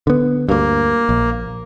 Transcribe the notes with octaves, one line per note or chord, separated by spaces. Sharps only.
D3 B3
D2 G2 A#3
A#1